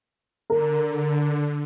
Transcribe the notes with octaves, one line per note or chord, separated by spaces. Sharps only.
D3 A#4